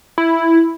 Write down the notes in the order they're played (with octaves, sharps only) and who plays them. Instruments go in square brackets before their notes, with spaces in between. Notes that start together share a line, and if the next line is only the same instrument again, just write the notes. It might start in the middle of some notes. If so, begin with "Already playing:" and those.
[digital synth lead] E4